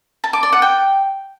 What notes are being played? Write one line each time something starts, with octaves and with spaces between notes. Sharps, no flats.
A5
D6
D5
F#5
G5